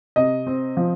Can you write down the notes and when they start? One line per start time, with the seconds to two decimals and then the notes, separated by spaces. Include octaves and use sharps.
0.16 C3 D#5
0.47 C4
0.77 F3